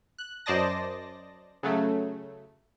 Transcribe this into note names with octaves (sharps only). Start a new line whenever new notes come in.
F#6
F#2 C5 D5 D#5 A5 A#6
C#3 F#3 A3